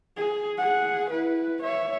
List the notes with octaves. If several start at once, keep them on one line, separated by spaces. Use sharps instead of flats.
G#4
G#4 F#5
E4 B4
C#5 E5